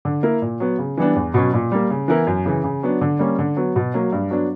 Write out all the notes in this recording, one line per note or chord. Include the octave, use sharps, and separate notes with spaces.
D3
A#3 E4 A#4
A#2
F#3 B3
C#3
E3 G3 B3 D4
E2
B2 F#3 C#4
A#2
G3 A#3
C#3
E3 B3 E4 A#4
F#2
C#3 E3
C#3
F#3 B3 D4
D3
G3 A#3 C#4
D3
F#3 B3
B2
F#3 A#3
G2
F#3 B3 D4